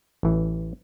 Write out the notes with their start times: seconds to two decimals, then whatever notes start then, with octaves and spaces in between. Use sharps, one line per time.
0.23 A1 E3